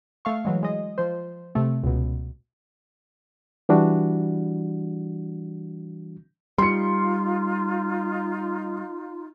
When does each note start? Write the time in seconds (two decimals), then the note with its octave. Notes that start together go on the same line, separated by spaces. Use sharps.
0.25 A3 F5 C#6
0.45 E3 F#3 G#3
0.63 G#3 D#5
0.98 F3 C5
1.55 C3 A3
1.83 C#2 B2
3.69 E3 G3 D4 F#4
6.58 G3 D#4 F4 C6 C#7